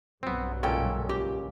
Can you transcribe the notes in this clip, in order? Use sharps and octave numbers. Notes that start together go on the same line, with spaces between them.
B1 G2 F#3 B3 C4
C#2 A#2 C#4 A4 G5
G4